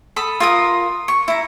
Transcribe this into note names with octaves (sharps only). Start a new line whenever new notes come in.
A4 B5 D#6
F4 A#4 D#6
C#6
E4 A#5